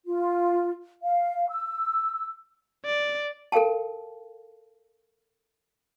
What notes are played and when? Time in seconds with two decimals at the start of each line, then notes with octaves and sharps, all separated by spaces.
0.07 F4
1.03 F5
1.49 E6
2.85 D5
3.52 A4 A#4 F5 G5 A5